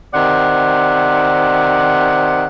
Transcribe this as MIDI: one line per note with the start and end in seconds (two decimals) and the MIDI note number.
0.14 2.47 48
0.14 2.47 51
0.14 2.47 72
0.14 2.47 74
0.14 2.47 78